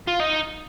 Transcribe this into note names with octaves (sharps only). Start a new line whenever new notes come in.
F4
D#4